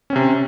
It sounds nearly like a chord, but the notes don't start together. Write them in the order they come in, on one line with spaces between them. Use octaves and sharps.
C#4 C4 C3